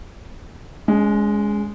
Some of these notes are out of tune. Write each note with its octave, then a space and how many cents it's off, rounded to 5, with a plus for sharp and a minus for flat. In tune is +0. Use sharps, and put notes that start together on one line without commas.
G#3 +0 C#4 +35